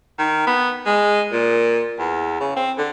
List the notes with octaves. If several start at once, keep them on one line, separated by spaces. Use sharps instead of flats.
D#3
B3
G#3
A#2
E2
C#3
C4
D3